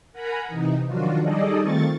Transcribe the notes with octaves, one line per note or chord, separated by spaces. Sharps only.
A#4 F#5 G#5 A#5 B5
C3 E3 D#4
D#3 F3 F#3 D4 F4 F#4
G3 D#4 G#4 A4 D5 D#5
D#3 A3 C4 F4 C#6 A6